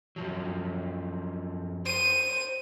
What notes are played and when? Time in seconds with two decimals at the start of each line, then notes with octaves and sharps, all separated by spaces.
0.16 F#2 F3 F#3
1.86 C5 D#7